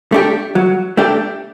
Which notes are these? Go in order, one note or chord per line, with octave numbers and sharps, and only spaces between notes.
A3 D4 G4
F#3
A3 D4 G4